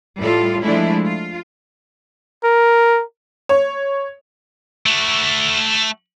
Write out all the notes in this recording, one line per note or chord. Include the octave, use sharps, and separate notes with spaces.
A2 G3 F4 A4
F3 G#3 A3 D4 E4
F4
A#4
C#5
A3 F#4